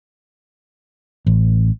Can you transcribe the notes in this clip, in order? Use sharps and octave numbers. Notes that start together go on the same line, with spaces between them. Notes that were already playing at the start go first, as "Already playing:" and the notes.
A1